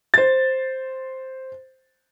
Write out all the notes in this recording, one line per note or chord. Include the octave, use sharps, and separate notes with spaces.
C5 A6